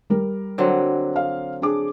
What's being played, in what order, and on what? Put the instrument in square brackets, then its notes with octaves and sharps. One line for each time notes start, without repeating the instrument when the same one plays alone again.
[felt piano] G3 A#4
[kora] D3 F#3 C4
[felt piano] F5
D4 G#4 D6